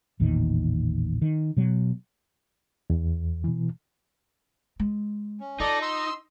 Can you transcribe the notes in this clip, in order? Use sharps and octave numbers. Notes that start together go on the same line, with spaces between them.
A1 E2 A#2 D#3
D#3
B2 F#3
E2
B2 E3
G#3
C#4
D#4 F4 A4 D5 D#5
C6 E6